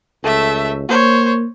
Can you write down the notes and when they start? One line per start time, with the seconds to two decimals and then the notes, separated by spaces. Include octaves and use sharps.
0.24 C#2 A3 E5
0.89 A#3 C5 C#5